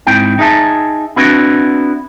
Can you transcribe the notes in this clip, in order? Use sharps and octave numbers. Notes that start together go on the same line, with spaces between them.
G#2 C4 E4 G5
D#4 G#4 E5 A5
B3 C4 D4 E4 F#4 B4